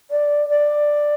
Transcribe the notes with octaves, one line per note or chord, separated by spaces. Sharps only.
D5
D5